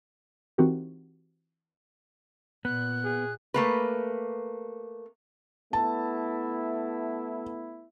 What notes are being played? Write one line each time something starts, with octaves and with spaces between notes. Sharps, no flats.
E3 C4 D#4 F#4 G4 A#4
A#2 B3 F#6
G#4
A3 A#3 B4
A3 B3 E4 A5